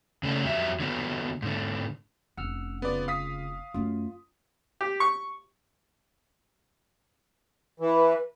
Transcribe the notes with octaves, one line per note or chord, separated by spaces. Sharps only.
C#3 A3 C#4 D4
F2 F#3 G3 E5
D3 F#3 B3
G#2 D3
F1 C#4 F#5 E6 F6
C#3 B3 F4 D5
F5 D#6 B6
F#2 A3 F4
G4
C#6
E3 B4